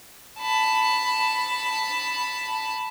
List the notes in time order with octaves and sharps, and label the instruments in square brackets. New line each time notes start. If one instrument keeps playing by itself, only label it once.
[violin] A5 B5